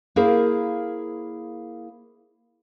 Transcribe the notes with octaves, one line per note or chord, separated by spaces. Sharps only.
A#3 E4 G#4 A#4 C5 F5